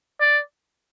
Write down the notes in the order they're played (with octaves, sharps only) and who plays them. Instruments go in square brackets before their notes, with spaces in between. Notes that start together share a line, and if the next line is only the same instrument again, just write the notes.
[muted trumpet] D5